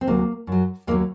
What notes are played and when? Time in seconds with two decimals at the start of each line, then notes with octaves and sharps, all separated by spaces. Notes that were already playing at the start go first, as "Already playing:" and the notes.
0.01 C4
0.07 D2 C3 F#3 A#3
0.47 F#2 F#3
0.87 D#2 D#3 F#3 A#3